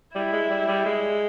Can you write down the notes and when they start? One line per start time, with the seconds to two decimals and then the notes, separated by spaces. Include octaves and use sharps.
0.15 G3 E4
0.32 G#3
0.50 G3
0.68 G3
0.86 G#3